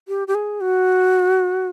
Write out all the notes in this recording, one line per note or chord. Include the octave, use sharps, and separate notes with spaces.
G4
G4
G#4
F#4